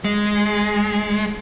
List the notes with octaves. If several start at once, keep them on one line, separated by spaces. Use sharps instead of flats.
G#3